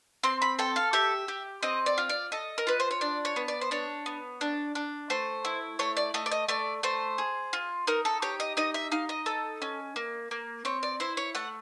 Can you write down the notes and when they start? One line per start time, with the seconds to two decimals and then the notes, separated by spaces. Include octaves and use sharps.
0.23 C4 C6
0.42 B5
0.59 A4 G5
0.76 F5
0.93 G4 E5
1.28 G4
1.63 C4 D#5
1.86 D5
1.98 F4
2.09 D5
2.32 A4 D#5
2.58 A#4
2.67 F4 B4
2.80 C5
2.91 C#5
3.01 D4 D5
3.25 C#5
3.36 B3
3.48 D5
3.61 C5
3.71 D4 C#5
4.06 B3
4.41 D4
4.75 D4
5.10 A3 C5
5.45 E4
5.79 A3 C#5
5.97 D5
6.14 A3 D#5
6.26 D5
6.32 D#5
6.48 A3 D5
6.83 A3 C5
7.18 G#4
7.53 F4
7.87 D#4 A#4
8.05 A4
8.22 G4 C#5
8.40 D#5
8.57 D#4 D#5
8.74 E5
8.92 D#4 F5
9.09 D#5
9.26 A4
9.62 C#4
9.96 A#3
10.31 A#3
10.65 C4 C#5
10.83 D5
11.00 E4 C5
11.17 C#5
11.35 A3 F#5